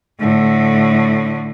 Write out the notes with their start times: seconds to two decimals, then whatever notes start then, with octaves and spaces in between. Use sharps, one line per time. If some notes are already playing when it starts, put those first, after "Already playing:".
0.20 A2 D3